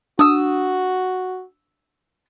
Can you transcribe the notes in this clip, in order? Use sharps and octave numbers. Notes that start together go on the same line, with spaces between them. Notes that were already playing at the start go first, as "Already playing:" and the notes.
D4 F#4 D#6 E6